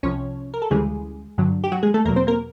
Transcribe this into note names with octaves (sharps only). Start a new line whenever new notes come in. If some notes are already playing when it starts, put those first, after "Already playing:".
C2 C3 F3 C#4 C#5
A#4
A4
D2 C#3 E3 G3 G#3 G#4
G2 D3 F#3
G4
F#3 F#4
G#3 G#4
A3 A4
E2 B2 F#3 A#3 A#4
C4 C5
A#3 A#4